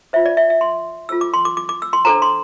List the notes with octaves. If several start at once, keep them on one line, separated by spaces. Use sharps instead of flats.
F4 C5 E5
D5
E5
E5
C6
F4 A4 C5 E6
D6
C6
D6
D6
D6
E6
C6
D4 A4 C5 A#5
C6